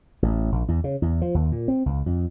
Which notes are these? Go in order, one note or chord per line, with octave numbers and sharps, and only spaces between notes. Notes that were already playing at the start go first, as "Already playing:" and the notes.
A1
A#1
E2
C#3
E2
F3
D#2
A#2
C4
C#2
F2